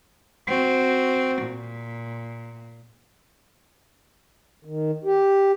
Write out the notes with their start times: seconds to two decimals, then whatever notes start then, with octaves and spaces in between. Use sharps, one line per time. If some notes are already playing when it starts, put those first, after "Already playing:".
0.47 C4 F#4
1.43 A#2
4.65 D#3
5.05 G4